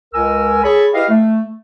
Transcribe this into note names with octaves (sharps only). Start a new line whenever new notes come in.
C#2 A#4 G#5 E6
G#4 A4 C#5 B5
E4 G4 B4 D#5 F5
A3